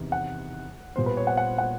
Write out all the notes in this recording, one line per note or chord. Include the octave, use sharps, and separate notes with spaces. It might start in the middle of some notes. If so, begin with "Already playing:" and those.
Already playing: E2 C3 D#3
F#5
A#2 G3 B3 C5
B4
C#5
F#5
F#5
F#5